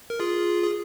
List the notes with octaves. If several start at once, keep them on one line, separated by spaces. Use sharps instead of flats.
A#4
F4 G#4
G#4